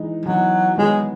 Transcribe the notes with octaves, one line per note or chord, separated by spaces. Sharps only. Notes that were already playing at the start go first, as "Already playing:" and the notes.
Already playing: E3 G#3 D#4
E3 F#3 B3 D#4
D#3 F#3 G#3 B3 F#4 C#5